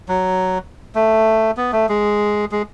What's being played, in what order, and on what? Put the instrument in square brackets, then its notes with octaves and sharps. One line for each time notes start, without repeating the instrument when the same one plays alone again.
[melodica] F#3
A3
B3
A3
G#3
G#3